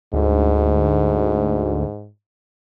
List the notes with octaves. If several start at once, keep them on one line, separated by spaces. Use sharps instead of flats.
D2 G#2